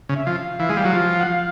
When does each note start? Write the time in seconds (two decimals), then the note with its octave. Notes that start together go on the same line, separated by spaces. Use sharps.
0.09 C#3
0.15 E5
0.26 F3 F5
0.59 E3 F5
0.69 G#3
0.77 G3
0.85 F#3
0.93 F3
1.20 F#5
1.26 F5